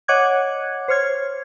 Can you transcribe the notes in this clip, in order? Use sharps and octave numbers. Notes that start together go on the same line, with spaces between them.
C#5 D#5 F#5 D6 F#6 G#6
C5 C#5 F6 G#6